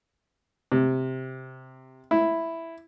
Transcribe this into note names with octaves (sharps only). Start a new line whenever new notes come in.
C3
E4